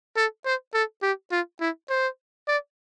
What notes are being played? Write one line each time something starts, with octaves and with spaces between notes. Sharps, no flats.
A4
C5
A4
G4
F4
E4
C5
D5